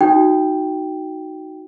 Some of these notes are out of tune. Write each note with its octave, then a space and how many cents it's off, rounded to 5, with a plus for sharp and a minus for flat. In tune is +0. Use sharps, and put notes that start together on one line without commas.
D#4 +0 F#4 +0 G5 +0